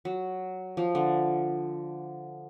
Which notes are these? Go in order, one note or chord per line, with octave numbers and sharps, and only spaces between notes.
F#3
F3
D3